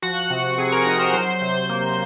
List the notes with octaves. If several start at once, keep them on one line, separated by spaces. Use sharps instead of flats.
F3 F#4 F#5
C3
C4 G#4 G#5
A#4 A#5
D#4
C5 C6
F#3 C5 C6
C3
A#3